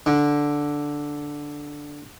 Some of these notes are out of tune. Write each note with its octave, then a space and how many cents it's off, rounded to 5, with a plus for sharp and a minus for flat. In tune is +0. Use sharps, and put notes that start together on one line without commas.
D3 -5